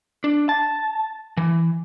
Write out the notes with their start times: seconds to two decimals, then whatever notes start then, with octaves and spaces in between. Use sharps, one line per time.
0.24 D4
0.49 A5
1.37 E3